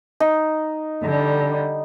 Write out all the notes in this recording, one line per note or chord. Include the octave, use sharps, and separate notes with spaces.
D#4
D3 G3